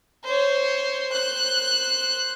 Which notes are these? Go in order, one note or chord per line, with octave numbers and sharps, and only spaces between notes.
C5 C#5
C5 F#6